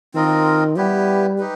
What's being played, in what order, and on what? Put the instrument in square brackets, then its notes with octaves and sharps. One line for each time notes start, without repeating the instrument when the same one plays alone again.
[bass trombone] D#3 [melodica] C4 F4 A#4 D#5
[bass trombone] G3 [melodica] B3 E4 G4 B4
[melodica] D#4 G4 B4